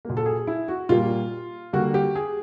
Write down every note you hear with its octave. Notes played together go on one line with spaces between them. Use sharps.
A#2 F#3 A#3
A4
G#4
E4
F#4
A#2 G3 A#3 F4
D3 G3 A#3 F#4
G4
G#4